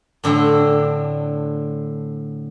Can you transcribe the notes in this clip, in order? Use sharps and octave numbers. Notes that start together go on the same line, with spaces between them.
A2 D3 C4 D4